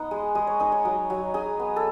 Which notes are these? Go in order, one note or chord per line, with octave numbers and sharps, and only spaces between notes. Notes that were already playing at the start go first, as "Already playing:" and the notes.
Already playing: B3 D#4 F#5
G#3
G#3 D#5
C#5
D#4 D#5
C#5
F#3
F#3
D#4 G#4
B3
A4